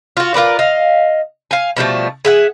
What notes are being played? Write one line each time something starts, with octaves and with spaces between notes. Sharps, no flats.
F4 F#4
F4 A#4 B4 D5
D#5 F5
F5 G#5
B2 F3 G3 A3
G#4 E5 F#5